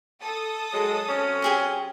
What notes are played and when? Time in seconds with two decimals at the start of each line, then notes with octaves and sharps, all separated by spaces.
0.21 A4 D#6
0.73 F#3 G#3
1.09 F#3 C4 C#4
1.42 G4 G#4 C5